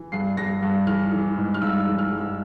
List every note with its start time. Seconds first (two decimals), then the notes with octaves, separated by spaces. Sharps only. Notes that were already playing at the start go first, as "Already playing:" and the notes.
Already playing: E3
0.12 G2 C7
0.37 G2 A#6
0.62 G2
0.87 E3 F6
1.11 E3
1.37 G#2
1.54 F6
1.62 G2 E6
1.80 E6
1.87 E3
1.99 F6
2.11 G2
2.18 E6